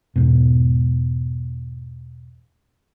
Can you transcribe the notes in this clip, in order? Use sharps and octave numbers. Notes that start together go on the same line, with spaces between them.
E2 G#2 B2